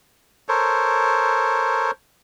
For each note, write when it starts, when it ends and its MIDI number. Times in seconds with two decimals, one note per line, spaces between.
0.49 1.91 69
0.49 1.91 70
0.49 1.91 72
0.49 1.91 73